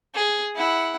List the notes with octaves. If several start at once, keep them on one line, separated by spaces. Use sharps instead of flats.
G#4
E4 F#5